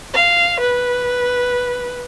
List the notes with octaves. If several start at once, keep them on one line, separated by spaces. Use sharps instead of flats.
F5
B4